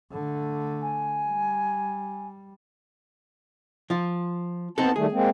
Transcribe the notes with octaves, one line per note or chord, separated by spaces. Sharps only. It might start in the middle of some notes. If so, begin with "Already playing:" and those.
D3 A3
G#5
G3
F3 F4
B3 C4 D#4 A4 A5
D#3 G3 A3 G#4
G#3 A#3 C4